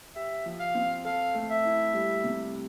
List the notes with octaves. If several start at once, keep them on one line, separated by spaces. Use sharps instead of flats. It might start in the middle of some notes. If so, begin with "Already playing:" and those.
G4 E5
F3
F5
C4
A4 F5
A3
E5
E4
G3
C3